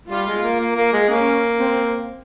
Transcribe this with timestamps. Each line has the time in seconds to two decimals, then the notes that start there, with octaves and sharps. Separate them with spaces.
0.09 G3 F4
0.27 G#3
0.42 A#3
0.60 A#3
0.76 A#3
0.93 G#3
1.09 A#3 C#4
1.60 C4